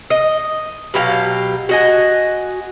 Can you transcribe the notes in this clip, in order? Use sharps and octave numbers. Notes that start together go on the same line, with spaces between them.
D#5
B2 F#3 G4 F5
F#4 D#5 G#5